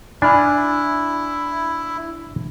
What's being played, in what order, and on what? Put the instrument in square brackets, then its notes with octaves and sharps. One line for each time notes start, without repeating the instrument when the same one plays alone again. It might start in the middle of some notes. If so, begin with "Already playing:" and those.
[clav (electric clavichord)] D4 [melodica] E4 [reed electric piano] G#5 B5 F6